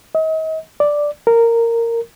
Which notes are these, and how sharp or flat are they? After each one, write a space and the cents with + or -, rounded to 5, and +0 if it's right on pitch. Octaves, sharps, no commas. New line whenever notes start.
D#5 +40
D5 +0
A#4 -10